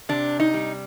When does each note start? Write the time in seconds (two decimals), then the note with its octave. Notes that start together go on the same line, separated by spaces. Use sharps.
0.09 C3 D4
0.40 D#4
0.54 G3